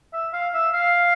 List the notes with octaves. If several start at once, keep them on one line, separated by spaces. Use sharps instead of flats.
E5
F5
E5
F5